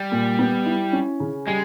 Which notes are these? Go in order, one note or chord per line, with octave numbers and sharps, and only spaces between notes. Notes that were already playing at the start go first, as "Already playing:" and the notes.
Already playing: G3
A#2
B3
E4
C#4
C#3
G3 G#3